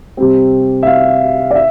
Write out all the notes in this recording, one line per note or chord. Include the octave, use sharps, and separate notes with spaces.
C3 G3 C4
E5
F5
D5
E5